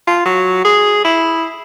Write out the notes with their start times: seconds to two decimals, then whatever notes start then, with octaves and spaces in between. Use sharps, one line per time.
0.07 F4
0.25 F#3
0.65 G#4
1.04 E4